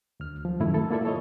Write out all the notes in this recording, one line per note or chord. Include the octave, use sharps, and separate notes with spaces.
D2 F6
F3
F#2 A2 D#3 G#3 A3 E4
A4
A#3 E4 F4 A4 D5 E5
A4 C#5 D#5